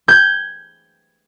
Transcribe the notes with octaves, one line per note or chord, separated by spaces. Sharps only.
G6 G#6